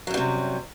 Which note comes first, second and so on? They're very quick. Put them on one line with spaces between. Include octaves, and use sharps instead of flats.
F#3 F#2 G3 C3